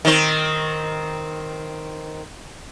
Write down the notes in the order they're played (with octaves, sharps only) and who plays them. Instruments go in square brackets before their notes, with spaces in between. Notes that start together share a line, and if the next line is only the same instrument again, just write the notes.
[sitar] D#3 C4